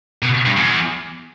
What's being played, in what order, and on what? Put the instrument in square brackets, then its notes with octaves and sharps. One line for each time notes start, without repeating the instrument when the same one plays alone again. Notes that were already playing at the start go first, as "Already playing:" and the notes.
[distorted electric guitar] B2
G2
E2